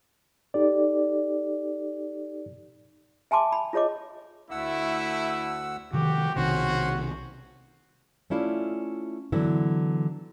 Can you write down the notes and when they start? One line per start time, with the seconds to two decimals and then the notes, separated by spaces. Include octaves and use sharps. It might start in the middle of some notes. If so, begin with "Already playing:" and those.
0.54 D#4 G4 A4 D5
3.31 E5 G#5 A5 C6 D6
3.52 B5
3.73 F4 G#4 C#5 D#5 D6
4.51 D2 A3 E4 F#5 E6
5.93 C3 D#3 F3 F#4 G4
6.36 B1 C3 D#3 C#4 F#4 C5 C6
8.30 A3 C#4 E4 F4 D5
9.32 D3 E3 F#3 B3 E4